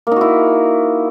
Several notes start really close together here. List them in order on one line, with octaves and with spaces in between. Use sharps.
A#3 D#4 F#4 E4